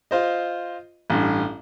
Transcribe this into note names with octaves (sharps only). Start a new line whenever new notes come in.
F4 C5 D#5
A1 G2